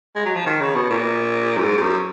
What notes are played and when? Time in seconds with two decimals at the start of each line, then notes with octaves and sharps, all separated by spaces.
0.16 G#3
0.25 F#3
0.36 F3
0.46 D#3
0.61 C#3
0.75 B2
0.90 A#2
1.57 F#2
1.63 G#2
1.77 G#2
1.82 F#2